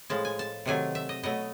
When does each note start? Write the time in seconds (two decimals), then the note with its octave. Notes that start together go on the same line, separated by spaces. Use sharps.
0.10 A2 F3 G#3 A5
0.25 G#5
0.39 A5
0.66 C3 D#3 F#3 A3 G#5
0.95 E5
1.09 D#5
1.23 B2 F#3 A3 D#5